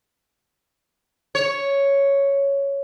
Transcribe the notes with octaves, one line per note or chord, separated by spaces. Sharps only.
C#5